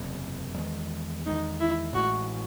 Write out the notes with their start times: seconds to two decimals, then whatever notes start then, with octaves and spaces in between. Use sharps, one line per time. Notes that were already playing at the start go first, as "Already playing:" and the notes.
Already playing: F#1 E2 C3
0.58 E2 D#3 G#3
1.26 E2 D#3 G#3 D#4
1.60 E4
1.94 A1 A2 E3 G#3 F#4